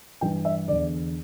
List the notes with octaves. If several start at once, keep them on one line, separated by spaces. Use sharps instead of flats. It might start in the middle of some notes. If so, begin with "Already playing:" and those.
G2 E3 G5
E5
E2 D3 D5